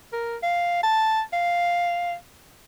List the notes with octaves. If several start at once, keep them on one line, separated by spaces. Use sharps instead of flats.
A#4
F5
A5
F5